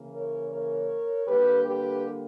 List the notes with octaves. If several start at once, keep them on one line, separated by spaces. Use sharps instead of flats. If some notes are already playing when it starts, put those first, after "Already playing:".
Already playing: C#3 E3 A#3
A#4 C#5
A#4 C#5
D3 G3 A#3 G4 B4
G4 B4